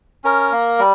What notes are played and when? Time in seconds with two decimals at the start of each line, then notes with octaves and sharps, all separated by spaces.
0.24 C#4 A#4
0.52 A#3
0.79 G3